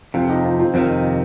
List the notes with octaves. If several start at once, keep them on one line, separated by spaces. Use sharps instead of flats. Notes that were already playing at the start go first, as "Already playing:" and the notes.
F2 C3 C4 F4
D#4 G4
C4 F4
C4 F4
F2 C3 D#3 C4 F4